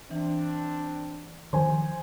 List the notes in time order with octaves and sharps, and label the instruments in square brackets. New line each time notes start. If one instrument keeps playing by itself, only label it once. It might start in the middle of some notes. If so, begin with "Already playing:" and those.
[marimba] E3 [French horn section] C4 D4
[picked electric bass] D#3 F3 [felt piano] C5 G#5